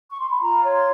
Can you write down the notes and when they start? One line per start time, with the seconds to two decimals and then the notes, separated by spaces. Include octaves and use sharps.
0.10 C#6
0.20 C6
0.30 B5
0.40 F4 A#5
0.64 C#5
0.71 C6